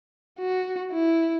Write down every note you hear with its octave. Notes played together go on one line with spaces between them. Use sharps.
F#4
E4